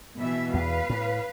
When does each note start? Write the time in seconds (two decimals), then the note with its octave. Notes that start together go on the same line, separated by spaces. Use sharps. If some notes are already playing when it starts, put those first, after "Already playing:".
0.17 B2 E3 E5
0.54 E2 B4 F5
0.90 A2